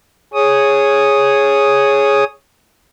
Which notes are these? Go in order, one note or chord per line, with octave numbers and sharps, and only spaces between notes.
G#4 C#5 D#6